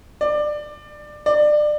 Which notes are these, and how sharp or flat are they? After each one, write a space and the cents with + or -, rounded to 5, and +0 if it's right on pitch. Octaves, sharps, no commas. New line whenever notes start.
D5 +20
D5 +25